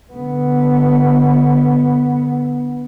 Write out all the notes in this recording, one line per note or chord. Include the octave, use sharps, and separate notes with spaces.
D3 B3